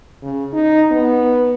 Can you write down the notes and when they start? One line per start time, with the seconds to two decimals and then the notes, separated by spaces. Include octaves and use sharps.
0.22 C#3
0.53 D#4
0.91 B3